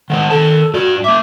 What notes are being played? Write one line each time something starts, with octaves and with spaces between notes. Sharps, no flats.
D#3 G#3 C5 F#5
D#3 A4 A5
G2 F#4 D5
A#3 E5 D6